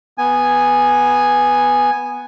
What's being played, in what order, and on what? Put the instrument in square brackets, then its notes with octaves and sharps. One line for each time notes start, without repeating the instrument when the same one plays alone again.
[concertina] B3 G#5